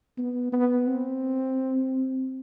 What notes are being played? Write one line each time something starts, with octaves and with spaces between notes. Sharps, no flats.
B3
B3
C4